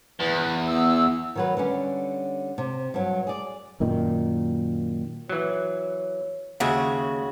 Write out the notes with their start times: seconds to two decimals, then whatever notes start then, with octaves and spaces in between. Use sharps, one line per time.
0.20 E2 B4
0.68 B3 E6
1.36 D#3 F#3 B4
1.57 D3 G3 C#4
2.58 C3
2.94 G2 F#3
3.27 G#4 D5
3.80 F#2 A#2 D#3
5.29 E3 F#3 C#5
6.60 D#2 C#3 G#3 F#4 E5